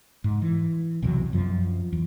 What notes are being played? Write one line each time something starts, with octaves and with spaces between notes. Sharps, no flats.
G#2
E3
B1 E2 C3 F#3
F#2 F3
E2